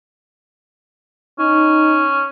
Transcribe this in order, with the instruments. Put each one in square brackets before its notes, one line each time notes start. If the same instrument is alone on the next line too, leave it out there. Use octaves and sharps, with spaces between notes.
[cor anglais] C#4 [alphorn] D#4